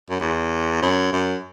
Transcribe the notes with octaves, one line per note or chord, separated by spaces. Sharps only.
F#2
E2
F#2
F#2